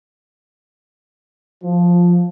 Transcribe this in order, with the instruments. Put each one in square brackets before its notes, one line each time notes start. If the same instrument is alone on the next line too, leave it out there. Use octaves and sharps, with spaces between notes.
[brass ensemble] F3